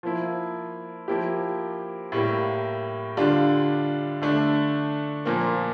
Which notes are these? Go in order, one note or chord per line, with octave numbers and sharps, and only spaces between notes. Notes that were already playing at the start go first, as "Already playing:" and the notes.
F3 A#3 E4
F3 A#3 E4 G4
A2 G3 A#3
D3 G3 D4 F4
D3 A3 D4
A#2 F3 A#3